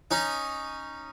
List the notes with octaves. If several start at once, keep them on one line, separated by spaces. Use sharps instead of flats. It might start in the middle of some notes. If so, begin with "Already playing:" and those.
C#4 D#4